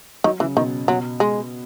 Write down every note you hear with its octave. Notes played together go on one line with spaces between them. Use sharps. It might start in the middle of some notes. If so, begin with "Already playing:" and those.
D#3 F#3
C#3 E3
B2 D#3
B2 F#3
G#3